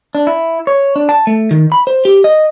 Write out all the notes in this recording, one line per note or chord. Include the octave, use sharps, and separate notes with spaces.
D4
E4
C#5
D4
A5
A3
D#3
B5
C5
G4
D#5